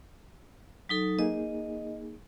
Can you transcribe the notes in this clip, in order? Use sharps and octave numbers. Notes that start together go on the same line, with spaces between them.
F#3 D#4 A4
A#3 D#4 G#4 D#5